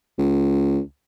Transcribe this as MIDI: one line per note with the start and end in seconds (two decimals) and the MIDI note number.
0.18 0.79 37